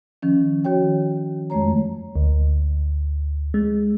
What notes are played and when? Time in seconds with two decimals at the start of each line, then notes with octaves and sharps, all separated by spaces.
0.22 D#3 F3 C#4
0.64 D#3 F#4 C#5 G5
1.50 F2 G#3 A3 C#5 A#5
2.15 D2
3.54 G#3